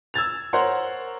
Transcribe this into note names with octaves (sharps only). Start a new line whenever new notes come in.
E6 G#6 A6 F7
A#4 C5 C#5 F#5 A#5 C6